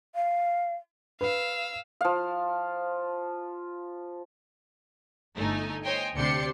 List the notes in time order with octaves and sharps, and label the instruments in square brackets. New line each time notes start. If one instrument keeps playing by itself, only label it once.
[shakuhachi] F5
[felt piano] B4 [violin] F5 E6
[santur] F3 F5
[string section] G1 A3 D#4 G#5
C5 C#5 D#5 G5 G#5
D2 C3 D4 G4 C6 C#7